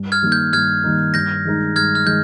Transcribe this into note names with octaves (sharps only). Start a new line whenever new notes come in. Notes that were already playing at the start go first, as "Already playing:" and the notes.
Already playing: G2
F6 G#6
D#3 G3 A#3 D#4
G6
G2 F6 G#6
D#3 G3 A#3 D#4
G2 G6 A#6
D#3 G#3 D#4
G2 F6 G#6
F6
D#3 G#3 D#4 G6